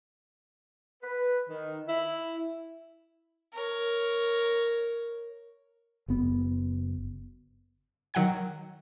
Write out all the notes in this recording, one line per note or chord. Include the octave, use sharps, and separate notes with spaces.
B4
D#3
E4
A#4 C#5
F#1 F#2 B3
D#3 F#3 F#5 G5 G#6